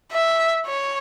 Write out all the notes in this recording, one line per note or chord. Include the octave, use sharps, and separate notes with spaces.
E5
C#5